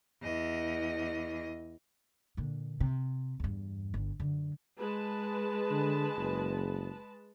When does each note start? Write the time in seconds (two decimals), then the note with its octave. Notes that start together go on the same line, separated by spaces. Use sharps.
0.22 E2 D#5
2.37 A#2 D3
2.80 C3
3.40 E2 G2
3.94 G1
4.20 F#2 D3
4.77 G#3 B4 A5
5.70 D3
6.16 F#1